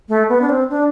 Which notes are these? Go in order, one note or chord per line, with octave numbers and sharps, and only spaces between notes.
A3
B3
D4
C4
D4